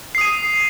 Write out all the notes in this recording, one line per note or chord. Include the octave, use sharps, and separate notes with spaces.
D#6 C7 D#7